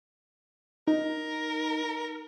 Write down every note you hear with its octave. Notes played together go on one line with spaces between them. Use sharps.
D#4 A#4